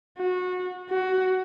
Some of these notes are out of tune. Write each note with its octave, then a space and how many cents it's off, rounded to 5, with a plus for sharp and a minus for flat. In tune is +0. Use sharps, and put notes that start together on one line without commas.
F#4 -25
F#4 +15